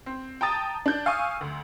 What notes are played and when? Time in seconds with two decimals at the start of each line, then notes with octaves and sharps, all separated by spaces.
0.06 C4
0.41 G5 A5 A#5 D#6 A6
0.86 D4 G6
1.06 F5 G#5 C#6 D#6 E6
1.41 D2